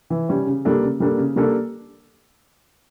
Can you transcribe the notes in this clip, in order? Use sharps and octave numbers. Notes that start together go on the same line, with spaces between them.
E3
G3 C#4
C#3
G3 A#3 D4 A4
C#3
G3 A#3 D4 A4
C#3
G3 A#3 D4 A4